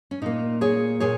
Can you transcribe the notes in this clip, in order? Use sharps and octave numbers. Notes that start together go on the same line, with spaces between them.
C#4
A#2 A#3 D#4
G#4 C#5
A#2 G#4 C#5